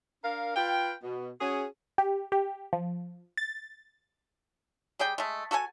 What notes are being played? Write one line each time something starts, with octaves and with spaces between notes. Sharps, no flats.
D4 A#4 F5
F4 B4 F5 G5
B2
C#4 F#4 G#4
G4
G4
F3
A6
G3 G#4 D5 G5
G#3 A3
F#4 A4 A#4 G#5